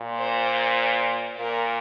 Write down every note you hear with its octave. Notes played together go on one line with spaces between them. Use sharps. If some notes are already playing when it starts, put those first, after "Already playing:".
Already playing: A#2
C5
A#2 A#4